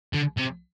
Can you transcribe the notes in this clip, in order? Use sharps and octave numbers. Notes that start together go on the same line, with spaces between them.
D3
C3